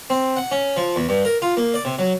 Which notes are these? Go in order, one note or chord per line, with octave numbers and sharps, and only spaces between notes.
C4
F#5
C#4
F3
E2
G2
A#4
F4
A#3
D5
C3
F#3